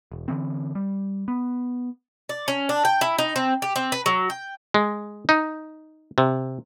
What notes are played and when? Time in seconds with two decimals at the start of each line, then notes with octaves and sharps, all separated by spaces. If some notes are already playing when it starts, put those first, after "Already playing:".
0.12 E1
0.28 D3 E3 C4
0.75 G3
1.28 B3
2.29 D5
2.48 C#4
2.69 D4
2.85 G5
3.01 E4
3.18 D#4
3.36 C4
3.62 G4
3.76 C4
3.92 B4
4.06 F#3
4.30 G5
4.74 G#3
5.29 D#4
6.18 C3